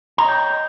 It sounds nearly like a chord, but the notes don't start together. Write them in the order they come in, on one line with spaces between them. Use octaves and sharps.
A#5 D#5 C#5 G5